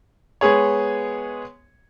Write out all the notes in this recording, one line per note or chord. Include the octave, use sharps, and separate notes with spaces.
G#3 B3 G#4 C#5